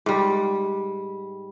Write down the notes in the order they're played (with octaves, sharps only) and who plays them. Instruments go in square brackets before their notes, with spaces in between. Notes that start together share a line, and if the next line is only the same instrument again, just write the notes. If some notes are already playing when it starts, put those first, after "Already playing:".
[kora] G#2 G3